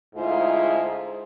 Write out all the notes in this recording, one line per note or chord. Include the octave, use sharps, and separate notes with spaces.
D2 G#2 G#3 E4 F4 C5